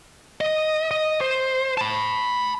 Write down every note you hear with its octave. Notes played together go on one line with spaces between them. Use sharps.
D#5
D#5
C5
A5 B5